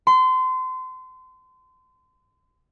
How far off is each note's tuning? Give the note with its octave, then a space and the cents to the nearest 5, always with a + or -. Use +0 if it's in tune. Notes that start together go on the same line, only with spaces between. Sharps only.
C6 -30